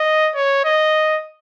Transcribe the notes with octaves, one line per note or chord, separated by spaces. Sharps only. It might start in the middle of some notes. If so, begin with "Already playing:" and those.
Already playing: D#5
C#5
D#5